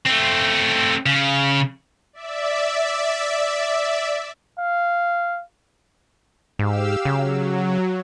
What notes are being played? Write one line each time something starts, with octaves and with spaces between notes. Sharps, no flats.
A3 C4
C#3
D5 E5
F5
G#2 G4 F5 E6
C#3 F#3